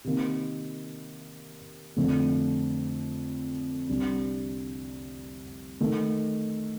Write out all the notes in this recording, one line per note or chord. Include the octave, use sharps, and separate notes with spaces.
C3 D#3 A#3
F2 D3 A3
C2 C3 G3 D4
D#3 A3